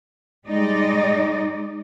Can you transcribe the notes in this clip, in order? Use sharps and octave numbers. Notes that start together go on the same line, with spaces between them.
G3 G#3 D#4 D5 D#5